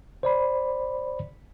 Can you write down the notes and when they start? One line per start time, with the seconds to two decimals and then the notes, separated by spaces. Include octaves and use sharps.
0.23 C5 D5 B5